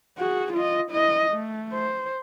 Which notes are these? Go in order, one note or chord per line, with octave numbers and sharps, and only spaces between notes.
F#4 G#4
F4 D#5
E4 D#5
A3
C5